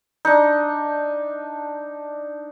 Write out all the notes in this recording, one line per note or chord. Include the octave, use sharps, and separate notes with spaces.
D4 D#4